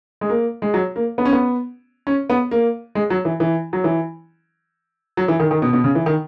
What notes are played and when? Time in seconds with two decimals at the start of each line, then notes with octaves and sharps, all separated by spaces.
0.21 G#3
0.30 A#3
0.62 G#3
0.74 F#3
0.96 A#3
1.18 B3
1.25 C#4
1.33 B3
2.07 C#4
2.30 B3
2.51 A#3
2.95 G#3
3.10 F#3
3.25 E3
3.40 E3
3.73 F#3
3.84 E3
5.17 F#3
5.28 E3
5.40 D#3
5.51 D#3
5.62 B2
5.73 B2
5.84 C#3
5.95 E3
6.06 D#3